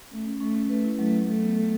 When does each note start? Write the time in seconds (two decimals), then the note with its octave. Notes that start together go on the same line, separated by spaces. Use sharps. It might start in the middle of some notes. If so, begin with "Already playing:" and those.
0.11 A3 C#4
0.26 C#4
0.40 A3 C#4
0.55 C#4
0.69 A3 B4
0.84 E4
0.99 F#3 A3
1.14 F#3
1.28 A3 A4
1.43 B3
1.57 A4